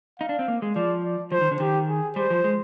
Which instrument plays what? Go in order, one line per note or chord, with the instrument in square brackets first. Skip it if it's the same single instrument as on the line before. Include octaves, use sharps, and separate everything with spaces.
[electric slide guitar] D#4 [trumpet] F5
[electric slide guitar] D4
C4
A#3
G#3
[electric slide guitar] F3 [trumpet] D5
[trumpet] D5
[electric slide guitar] F3 [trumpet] C5
[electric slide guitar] D#3
D3
[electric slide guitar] D#3 [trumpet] G4
[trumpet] G#4
[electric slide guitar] G3 [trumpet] C5
[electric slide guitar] F3
G#3